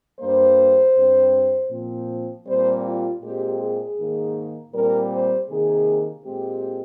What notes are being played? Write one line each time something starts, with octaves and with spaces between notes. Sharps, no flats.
G2 G3 A#3 C5
G2 G3 C4
A#2 F3 C4
A#2 G3 C4 C5
F4
A#2 G#3 C4 G4
G#4
G#2 D#3 A#3
A#2 G3 C4 A#4
C5
C3 D#3 A#3 G#4
A#2 G#3 C4 G4